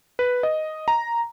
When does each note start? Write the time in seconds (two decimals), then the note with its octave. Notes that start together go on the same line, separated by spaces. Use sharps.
0.19 B4
0.43 D#5
0.88 A#5